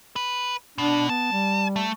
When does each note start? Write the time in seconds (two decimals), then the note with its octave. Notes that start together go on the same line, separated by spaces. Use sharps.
0.16 B4
0.78 B2 D4
1.09 B3 A5
1.32 G3
1.76 A3